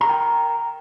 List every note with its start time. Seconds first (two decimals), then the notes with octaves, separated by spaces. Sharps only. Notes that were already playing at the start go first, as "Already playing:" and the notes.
0.01 A#5
0.05 A#4
0.09 G5